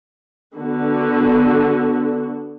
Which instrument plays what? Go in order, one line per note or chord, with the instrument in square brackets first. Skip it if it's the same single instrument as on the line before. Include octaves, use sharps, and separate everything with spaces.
[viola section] D3 B3 F#4